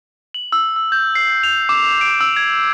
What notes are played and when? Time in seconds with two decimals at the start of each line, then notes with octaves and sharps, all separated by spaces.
0.34 F#7
0.52 E6
0.76 E6
0.92 G6
1.15 C7
1.43 F7
1.69 D6
2.01 D7
2.20 E6
2.36 G#6